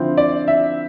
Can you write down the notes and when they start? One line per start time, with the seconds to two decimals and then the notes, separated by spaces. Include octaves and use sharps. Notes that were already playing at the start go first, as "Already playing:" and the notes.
Already playing: D3 F3 C4 E4
0.18 D5
0.48 E5